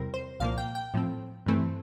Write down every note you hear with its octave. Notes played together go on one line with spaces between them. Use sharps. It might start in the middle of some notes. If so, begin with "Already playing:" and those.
Already playing: E2 C3 G3 C4 A#4
C5
C2 A#2 F3 A#3 F5
G5
G5
A2 F3 C4
G2 E3 A3 C4